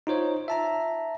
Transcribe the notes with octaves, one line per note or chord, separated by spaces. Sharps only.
D#4 F4 C5 C#5
E5 A5 A#5